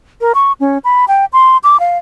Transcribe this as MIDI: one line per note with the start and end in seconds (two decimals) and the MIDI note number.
0.21 0.32 70
0.35 0.52 85
0.60 0.78 61
0.84 1.05 83
1.08 1.25 79
1.33 1.57 84
1.63 1.79 86
1.80 1.98 77